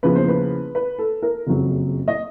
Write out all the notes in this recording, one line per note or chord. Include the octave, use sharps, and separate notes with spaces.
E2 C#3 F3 A#3 B4
C5
B4
B4
A4
A#4
F#1 F2 C#3 F#3
D#5